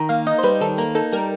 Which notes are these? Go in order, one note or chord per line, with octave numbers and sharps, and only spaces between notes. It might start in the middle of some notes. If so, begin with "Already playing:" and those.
Already playing: D#3 A#5
A#3 F5
D#4 D#5
C5
G3 B4
D#3 A4
A#3 A#4
D#4 A4
G3 A#4